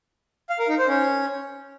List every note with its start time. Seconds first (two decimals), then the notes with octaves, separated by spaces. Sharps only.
0.50 F5
0.59 A#4
0.69 D#4
0.78 C5
0.88 C#4